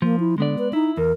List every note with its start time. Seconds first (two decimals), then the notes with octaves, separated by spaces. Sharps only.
0.02 F3 A#3
0.20 E4
0.38 D3 G#3 B3 D5
0.58 B4
0.73 D#4 E4
0.97 E2 A#4